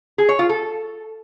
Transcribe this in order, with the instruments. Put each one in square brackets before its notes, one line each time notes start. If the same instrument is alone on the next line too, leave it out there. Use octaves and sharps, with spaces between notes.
[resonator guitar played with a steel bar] G#4
C#5
F4
A4